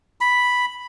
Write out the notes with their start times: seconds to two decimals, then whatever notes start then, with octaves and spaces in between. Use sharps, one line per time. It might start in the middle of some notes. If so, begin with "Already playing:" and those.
0.21 B5